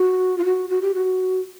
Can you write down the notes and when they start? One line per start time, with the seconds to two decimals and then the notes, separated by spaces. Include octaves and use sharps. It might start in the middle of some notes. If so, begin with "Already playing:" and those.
Already playing: F#4
0.38 F4
0.44 F#4
0.70 F#4
0.82 G4
0.95 F#4